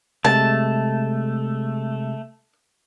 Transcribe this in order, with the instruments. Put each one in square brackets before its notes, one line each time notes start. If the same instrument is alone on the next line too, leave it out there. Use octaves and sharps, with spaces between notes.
[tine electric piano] C3 G#3 [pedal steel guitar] A3 [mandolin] A5